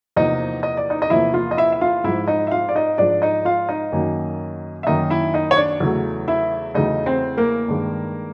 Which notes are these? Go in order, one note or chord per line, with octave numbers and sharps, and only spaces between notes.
E2 C3 F3 A#3 D#4 D#5
D#5
D5
D#4 D#5
D#5
E2 C3 F3 A#3 E4 E5
F4 F5
D#5
E4 E5
E5
F4 F5
G#2 F3 G#3 E4 E5
D#4 D#5
E5
F4 F5
D5
D#4 D#5
G#2 F3 G#3 D4 D5
D#4 D#5
F4 F5
D#4 D#5
F#2 D#3 F#3 A#3
E5
F#2 D#3 F#3 A#3 D#4 D#5
E4 E5
D#4 D#5
C#5
D4 D5
E2 C#3 F#3 A3
E4 E5
E2 C#3 F#3 A3 D#4 D#5
C4 C5
A#3 A#4
G2 D#3 G#3